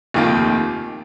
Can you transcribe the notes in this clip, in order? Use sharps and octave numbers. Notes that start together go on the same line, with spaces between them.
F1 D#2 D#3 A#3 F4